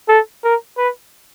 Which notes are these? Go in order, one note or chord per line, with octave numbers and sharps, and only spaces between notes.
A4
A#4
B4